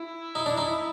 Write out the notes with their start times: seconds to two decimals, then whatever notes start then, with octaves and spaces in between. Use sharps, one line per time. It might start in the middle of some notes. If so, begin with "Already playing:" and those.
Already playing: E4
0.35 D#4
0.46 D4
0.57 D#4